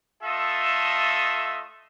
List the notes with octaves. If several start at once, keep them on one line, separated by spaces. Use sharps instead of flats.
A3 F4 A4 D#5 E5